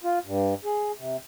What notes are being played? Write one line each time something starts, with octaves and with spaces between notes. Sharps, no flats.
F4
G2
G#4
C3